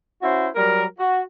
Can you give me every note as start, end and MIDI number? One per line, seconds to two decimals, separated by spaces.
0.22 0.47 61
0.22 0.47 64
0.22 0.47 66
0.22 0.47 72
0.56 0.84 54
0.56 0.84 55
0.56 0.84 70
0.98 1.20 66